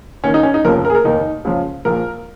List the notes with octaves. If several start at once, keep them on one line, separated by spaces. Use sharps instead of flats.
D#2 D#3 C#4
D#4
C#4
D#4
F1 D#2 C#3 F3 A#4
A#4
G#4
A#4
F1 D#2 D#3 D#4
C#2 C#3 F3
A#1 A#2 F3 A#4